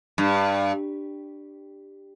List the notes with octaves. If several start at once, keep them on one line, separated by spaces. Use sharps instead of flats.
G2